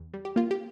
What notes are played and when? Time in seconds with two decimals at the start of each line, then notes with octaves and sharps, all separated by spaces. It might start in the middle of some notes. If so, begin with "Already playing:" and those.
Already playing: E2
0.14 G3
0.25 G4
0.36 A#3 F4
0.51 G4